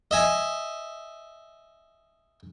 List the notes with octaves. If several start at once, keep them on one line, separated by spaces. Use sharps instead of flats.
D#5 E5 G#5